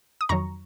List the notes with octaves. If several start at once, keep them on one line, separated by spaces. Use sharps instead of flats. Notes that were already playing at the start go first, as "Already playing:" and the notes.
D#6
F2 D#3 F#3 A#5 C#6